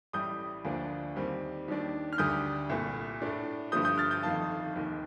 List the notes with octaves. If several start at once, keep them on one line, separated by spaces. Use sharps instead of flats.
A1 A2 G3 D#6 G6
D2 D3 F3 A#3 D4
D#2 D#3 G3 C4
D#2 D#3 G3 D4
F6
D2 D3 G3 D#6 G6
C2 A#2 A3
A2 A3 D4
G2 D3 F3 A3 D#6 G6
D#6 G6
F6 A6
D#6 G6
G1 F2 D#3 F5 A5
F1 D#2 D#3